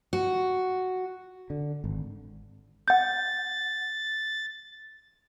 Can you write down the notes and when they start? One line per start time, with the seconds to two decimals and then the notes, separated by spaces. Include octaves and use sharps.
0.13 F#4
1.50 D3
1.84 G#1
2.88 F#5 G6 A6